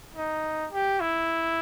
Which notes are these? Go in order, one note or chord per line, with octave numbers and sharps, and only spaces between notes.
D#4
G4
E4